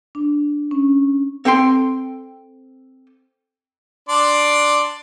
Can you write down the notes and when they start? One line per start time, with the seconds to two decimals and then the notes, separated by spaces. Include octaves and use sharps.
0.15 D4
0.71 C#4
1.45 C4 A4 G5 C6
4.09 D4 D5 C6